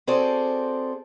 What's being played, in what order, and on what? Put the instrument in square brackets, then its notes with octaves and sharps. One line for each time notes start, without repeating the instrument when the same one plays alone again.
[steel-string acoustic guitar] C4 F#4 G#4 A4 C5 D5